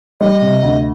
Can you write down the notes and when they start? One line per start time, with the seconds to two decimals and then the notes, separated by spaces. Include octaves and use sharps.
0.21 G3 D#5
0.42 C3
0.63 D2